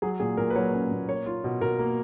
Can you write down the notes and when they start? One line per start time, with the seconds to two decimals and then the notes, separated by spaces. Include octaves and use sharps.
0.02 F#3 G#4
0.20 A#2 G#4
0.37 A#2 A#4
0.50 B4
0.55 F#3 C#5
0.73 C#4
0.91 A#2
1.09 A#3 C#5
1.26 F4
1.44 B2
1.61 B2 A#4
1.79 A#3